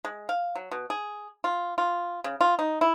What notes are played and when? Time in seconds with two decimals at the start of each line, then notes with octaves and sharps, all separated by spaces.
0.05 G#3
0.29 F5
0.55 F#3
0.71 B2
0.90 G#4
1.44 F4
1.78 F4
2.24 C#3
2.41 F4
2.59 D#4
2.81 E4